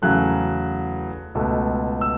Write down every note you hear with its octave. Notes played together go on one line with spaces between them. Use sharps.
E2 C#3 F#3 A3 F#6
C#2 B2 A3
E6